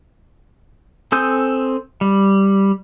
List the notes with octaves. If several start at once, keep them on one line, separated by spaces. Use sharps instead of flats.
C4 A4 G#5 D#6 G6
G3